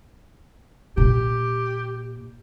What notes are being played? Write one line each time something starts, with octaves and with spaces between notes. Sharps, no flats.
A#2 G4